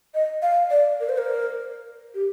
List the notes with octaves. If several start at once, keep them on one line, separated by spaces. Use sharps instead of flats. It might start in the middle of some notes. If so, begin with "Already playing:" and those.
D#5
F5
D5
A#4
C5
A#4
G4